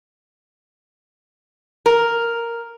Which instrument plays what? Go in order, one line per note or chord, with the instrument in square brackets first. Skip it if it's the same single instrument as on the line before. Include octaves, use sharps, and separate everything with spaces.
[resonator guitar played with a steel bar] A#4